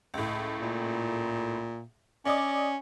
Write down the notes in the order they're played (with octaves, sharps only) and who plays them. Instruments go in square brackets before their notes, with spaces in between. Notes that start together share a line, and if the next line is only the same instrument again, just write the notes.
[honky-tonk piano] C#2 A2
[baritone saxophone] A#2
[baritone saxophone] C#4 [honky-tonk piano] D5 D#5 D6